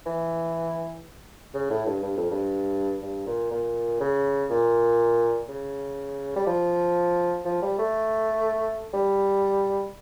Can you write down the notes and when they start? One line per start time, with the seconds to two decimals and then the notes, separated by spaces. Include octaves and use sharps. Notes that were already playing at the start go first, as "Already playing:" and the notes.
0.06 E3
1.54 C#3
1.70 A2
1.86 G2
2.03 G2
2.17 F2
2.31 G2
3.02 G2
3.26 A#2
3.51 A#2
4.00 C#3
4.50 A#2
5.49 C#3
6.36 G3
6.47 F3
7.46 F3
7.62 G3
7.79 A3
8.94 G3